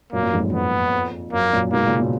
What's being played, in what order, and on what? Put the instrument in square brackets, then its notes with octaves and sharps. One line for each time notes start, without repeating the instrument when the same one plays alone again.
[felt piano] F#2 A#2 [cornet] A#3
[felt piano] F#2 A#2
F2 G#2
F#2
[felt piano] F2 [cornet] B3
[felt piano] F#2 [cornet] A#3
[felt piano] F#2 A#2
[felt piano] G#2 B2 [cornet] A#3
[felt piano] A#2 C#3
B2